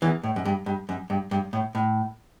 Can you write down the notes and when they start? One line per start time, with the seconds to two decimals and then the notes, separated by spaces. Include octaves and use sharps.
0.02 E2 E3
0.23 A2
0.36 F#2
0.45 G2
0.66 G2
0.89 F#2
1.10 G2
1.31 G2
1.53 A2
1.75 A2